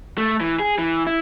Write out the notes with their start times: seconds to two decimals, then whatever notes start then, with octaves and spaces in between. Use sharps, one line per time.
0.18 A3
0.41 E3
0.60 G#4
0.78 E3
1.07 E4